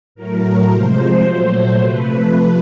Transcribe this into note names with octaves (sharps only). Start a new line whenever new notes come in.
A2 F#3 A3 A#4
C3 F3 G#3 C5
A#2 F#3 A3 C5
C3 F3 A3 B4